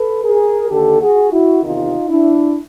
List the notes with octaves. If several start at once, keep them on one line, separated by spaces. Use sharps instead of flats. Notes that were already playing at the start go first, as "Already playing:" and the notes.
Already playing: A4 B4
G#4 A#4
D#2 D3 G4 A4
F#4 G#4
E4 F#4
E2 C3 D#3 D#4 F4
D4 E4